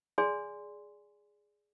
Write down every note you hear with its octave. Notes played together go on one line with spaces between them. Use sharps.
G#4 D5 G#5 C6